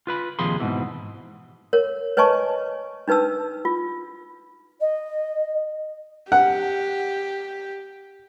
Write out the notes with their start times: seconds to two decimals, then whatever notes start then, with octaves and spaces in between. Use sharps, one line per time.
0.07 F4 B4 B5
0.39 D#2 C3 F3 G#4 B5 C6
0.60 G#2 B2 E3
1.73 A#4 C#5
2.17 B4 C#5 D#5 G#5 A5 C#6
3.08 D4 D#4 B4 A5 E6
3.65 F4
4.80 D#5
6.32 G4 F#5